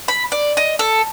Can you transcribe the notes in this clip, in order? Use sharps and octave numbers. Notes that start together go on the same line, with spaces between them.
B5
D5
D#5
A4